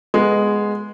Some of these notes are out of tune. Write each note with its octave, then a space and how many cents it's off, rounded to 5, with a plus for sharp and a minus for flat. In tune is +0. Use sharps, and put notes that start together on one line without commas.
G#3 +0 B3 +0